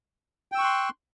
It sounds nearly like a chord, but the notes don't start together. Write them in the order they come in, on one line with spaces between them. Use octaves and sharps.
G5 E6 C#6 F#6 C6